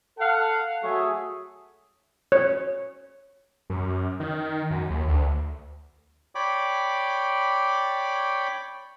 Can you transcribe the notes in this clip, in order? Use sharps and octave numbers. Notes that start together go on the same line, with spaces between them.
A4 F5 F#5
F#3 A3 G#4
C#5
F#2
D#3
F#2
D#2
D2
C#5 D5 G5 B5 D6